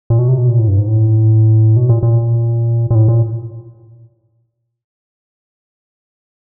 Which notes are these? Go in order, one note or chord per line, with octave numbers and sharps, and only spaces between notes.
A#2
B2
C3
B2
A#2
A2
G2
G#2
A2
B2
A#2
A#2
A#2
A2
A#2